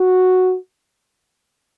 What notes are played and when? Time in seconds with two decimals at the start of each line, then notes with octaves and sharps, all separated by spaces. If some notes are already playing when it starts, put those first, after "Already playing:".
Already playing: F#4